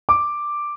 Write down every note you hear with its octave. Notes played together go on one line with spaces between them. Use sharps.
D6